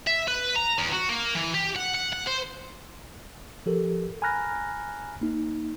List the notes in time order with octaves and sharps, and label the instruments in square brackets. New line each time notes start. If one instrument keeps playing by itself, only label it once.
[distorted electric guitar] E5
B4
A#5
E2
F#4
A#3
E3
G4
F#5
F#5
F#5
C5
[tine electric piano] F3 G4 A4 A#4
G#5 A#5 B5 F6 F#6 A#6
A#3 D#4